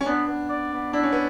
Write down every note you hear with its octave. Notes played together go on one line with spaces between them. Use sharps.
C#4
B3 D4
B3
D5
B3
D4 E4
C#4
B3